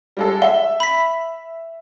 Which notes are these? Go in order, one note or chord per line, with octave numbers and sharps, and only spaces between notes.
G3 G#3 A4
E5 G7
B5 B6